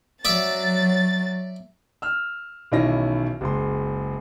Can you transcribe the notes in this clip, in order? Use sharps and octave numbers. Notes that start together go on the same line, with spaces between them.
F#3 D5 E5 A6
E6 F6
B1 D#3 E3 C#4 E4 A#6
F#1 C#2 C6